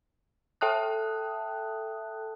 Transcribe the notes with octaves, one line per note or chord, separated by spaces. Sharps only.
A4 E5 G5 A5 D#6 F#6